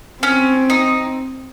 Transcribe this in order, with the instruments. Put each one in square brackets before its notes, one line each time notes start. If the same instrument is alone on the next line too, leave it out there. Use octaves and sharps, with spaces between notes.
[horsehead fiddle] C4 [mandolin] C#4
[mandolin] D#4